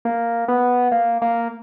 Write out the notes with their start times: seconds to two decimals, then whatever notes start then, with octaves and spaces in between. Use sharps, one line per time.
0.05 A#3
0.48 B3
0.92 A#3
1.22 A#3